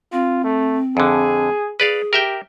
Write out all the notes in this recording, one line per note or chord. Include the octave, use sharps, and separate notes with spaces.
C4 F4
A3
F2 D3 G#4
G#4 B4 D5 F5
G4 A#4 E5 G5